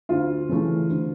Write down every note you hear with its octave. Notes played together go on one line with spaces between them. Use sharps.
D2 F4
C#3 E3 A3
D2